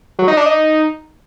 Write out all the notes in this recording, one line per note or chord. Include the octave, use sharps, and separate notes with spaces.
F#3
D#4
D4
D#4